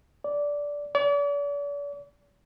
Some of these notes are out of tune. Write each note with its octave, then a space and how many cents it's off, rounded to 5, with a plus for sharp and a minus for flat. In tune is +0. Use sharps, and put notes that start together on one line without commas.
D5 -10
D5 -40